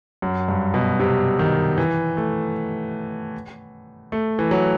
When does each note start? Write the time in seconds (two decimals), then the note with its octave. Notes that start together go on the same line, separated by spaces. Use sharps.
0.22 F#2
0.48 G2
0.74 B2
1.00 C3
1.39 D#3
1.78 E3
2.17 A3
4.12 A3
4.39 E3
4.51 F#3